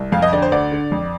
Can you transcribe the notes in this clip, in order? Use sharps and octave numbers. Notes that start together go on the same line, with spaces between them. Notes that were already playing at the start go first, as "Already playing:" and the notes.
Already playing: C2
F2 F5
D#5
D3 D5
C5
D2 D5
D3
F2